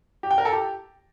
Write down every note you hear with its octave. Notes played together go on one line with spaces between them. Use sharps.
G4
G5
A#4
A4
G4